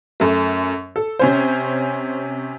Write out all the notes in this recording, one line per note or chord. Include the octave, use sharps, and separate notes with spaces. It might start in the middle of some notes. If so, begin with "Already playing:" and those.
F#2 A3
A4
C3 C#4 C5